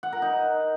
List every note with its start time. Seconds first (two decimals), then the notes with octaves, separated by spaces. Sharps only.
0.03 F#5
0.13 A#4
0.22 D#4